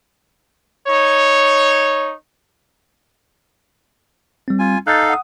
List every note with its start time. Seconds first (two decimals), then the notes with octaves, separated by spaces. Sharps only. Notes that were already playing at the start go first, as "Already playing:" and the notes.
0.87 D#4 C#5
4.48 G3 C4
4.59 F4 G#5
4.87 D#4 A4 F5 F#6 G6 A6
5.09 F#5 D#6